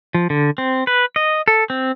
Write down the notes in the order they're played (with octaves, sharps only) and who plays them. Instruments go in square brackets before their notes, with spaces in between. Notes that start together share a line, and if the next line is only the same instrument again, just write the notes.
[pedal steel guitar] F3
D3
C4
B4
D#5
A4
C4